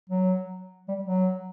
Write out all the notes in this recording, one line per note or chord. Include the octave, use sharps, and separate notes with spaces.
F#3
G3
F#3